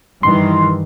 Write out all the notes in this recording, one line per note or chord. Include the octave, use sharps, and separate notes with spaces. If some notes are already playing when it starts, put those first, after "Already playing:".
G2 D#3 E3 C6